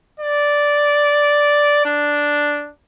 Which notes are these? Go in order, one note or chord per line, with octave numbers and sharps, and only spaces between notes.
D5
D4